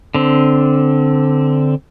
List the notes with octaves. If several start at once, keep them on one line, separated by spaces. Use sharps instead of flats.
D3 C4